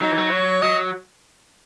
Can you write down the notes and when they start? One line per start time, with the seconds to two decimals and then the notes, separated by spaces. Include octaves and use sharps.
0.02 F#3 D#4
0.12 E3
0.18 F#3
0.32 C#5
0.62 F#3 D#5